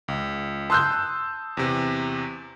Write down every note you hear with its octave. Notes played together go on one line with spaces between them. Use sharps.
C#2
A5 C6 D#6 E6 F#6 G6
E2 C3